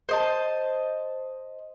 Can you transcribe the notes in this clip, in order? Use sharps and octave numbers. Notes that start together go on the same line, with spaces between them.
C5 D#5 A5